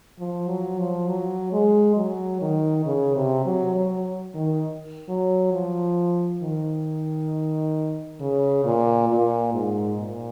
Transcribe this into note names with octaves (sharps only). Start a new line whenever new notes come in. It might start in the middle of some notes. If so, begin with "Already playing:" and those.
F3
F#3
F3
F#3
G#3
F#3
D#3
C#3
C3
F#3
F#3
D#3
F#3
F3
D#3
C#3
A#2
A#2
G#2
A#2